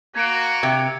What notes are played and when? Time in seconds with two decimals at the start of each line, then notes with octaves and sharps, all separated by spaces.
0.15 A#3 F#4 G#6 C#7 D7
0.63 C3